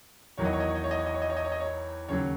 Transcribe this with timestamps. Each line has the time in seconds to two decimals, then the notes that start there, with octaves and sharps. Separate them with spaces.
0.38 E2 D#3 F#3 C#5
0.45 D#5
0.53 C#5
0.60 D#5
0.68 C#5
0.75 D#5
0.84 C#5
0.91 D#5
0.99 C#5
1.06 D#5
1.14 C#5
1.22 D#5
1.30 C#5
1.37 D#5
1.44 C#5
1.52 D#5
1.60 C#5
2.08 D#2 C#3 F#3 C#5